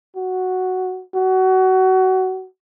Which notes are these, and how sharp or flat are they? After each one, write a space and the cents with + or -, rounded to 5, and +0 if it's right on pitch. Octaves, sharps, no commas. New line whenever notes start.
F#4 +0
F#4 +25